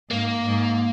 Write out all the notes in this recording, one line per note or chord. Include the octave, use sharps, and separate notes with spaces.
G#2 A#3
G#2